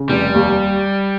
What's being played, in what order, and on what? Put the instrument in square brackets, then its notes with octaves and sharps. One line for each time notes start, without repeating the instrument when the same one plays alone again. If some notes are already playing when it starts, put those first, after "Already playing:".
Already playing: [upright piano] C#3
[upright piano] F1 [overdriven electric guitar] G3
[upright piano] D#2